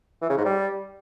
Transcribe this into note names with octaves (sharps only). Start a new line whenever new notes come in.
E3
C#3
G#2
G3